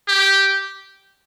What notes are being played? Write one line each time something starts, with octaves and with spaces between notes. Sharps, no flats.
G4